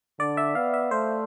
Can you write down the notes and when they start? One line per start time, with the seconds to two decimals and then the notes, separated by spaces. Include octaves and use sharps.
0.19 D3 D5
0.37 E5
0.55 B3 F5
0.74 E5
0.91 A3 C5